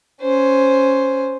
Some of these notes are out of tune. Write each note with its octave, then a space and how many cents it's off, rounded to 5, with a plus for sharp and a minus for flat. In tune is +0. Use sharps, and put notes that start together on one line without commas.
C#4 +0 C5 +0